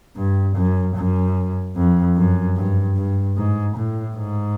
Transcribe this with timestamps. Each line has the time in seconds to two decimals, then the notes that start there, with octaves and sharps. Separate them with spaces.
0.17 G2
0.56 F#2
0.96 F#2
1.76 F2
2.16 F#2
2.57 G2
2.97 G2
3.37 G#2
3.76 A2
4.16 G#2